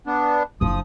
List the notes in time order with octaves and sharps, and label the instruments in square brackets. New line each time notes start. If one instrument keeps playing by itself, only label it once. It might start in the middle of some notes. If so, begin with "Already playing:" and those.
[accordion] B3 D4
[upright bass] F#1 D4 [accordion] F3 D#6